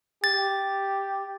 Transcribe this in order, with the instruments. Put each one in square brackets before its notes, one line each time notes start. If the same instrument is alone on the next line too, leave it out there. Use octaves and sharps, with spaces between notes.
[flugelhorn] G4 [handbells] A6